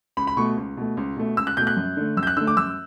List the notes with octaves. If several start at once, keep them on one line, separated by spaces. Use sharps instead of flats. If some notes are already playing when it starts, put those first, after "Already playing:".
C#2 B5
B5
B2 A3 C#6
C#2
B2 A3
C#2
B2 A3
C#2 E6
F#6
B2 A3 G6
F#6
F#2
D3 A3
F#2 E6
G6
F#6
D3 A3 E6
D6
F#2 E6